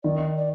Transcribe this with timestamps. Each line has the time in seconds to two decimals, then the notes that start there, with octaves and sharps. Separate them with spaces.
0.04 D#3 D5
0.15 D#5
0.37 D5